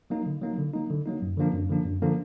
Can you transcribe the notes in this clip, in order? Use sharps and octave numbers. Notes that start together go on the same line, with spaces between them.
F#3 A#3 D#4
D3
F#3 A#3 D#4
D3
F#3 A#3 D#4
D3
F#3 A#3 D#4
F#2
D3 F3 A#3 D4
F#2
D3 F3 A#3 D4
F#2
D3 F3 A#3 D4